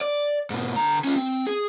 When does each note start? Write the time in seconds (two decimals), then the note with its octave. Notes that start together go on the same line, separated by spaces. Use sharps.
0.01 D5
0.50 G#2 B2
0.76 D3 A#5
1.04 C#4 F4
1.16 C4
1.47 G#4